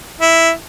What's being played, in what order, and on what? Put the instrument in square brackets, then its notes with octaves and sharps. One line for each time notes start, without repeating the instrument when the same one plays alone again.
[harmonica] E4